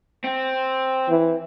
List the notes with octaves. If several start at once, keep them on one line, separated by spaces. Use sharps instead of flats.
C4
E3